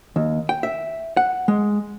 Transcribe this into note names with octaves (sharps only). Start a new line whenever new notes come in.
D#2
G5
E5
F#5
G#3